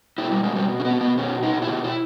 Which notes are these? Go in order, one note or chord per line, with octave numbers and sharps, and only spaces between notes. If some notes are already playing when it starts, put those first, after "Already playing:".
B2 E4
G3
B2 G#3
G3
B2
C#4
B3
B2
B3
B2 C#4
B2 D#4
E4
B2 G4
E4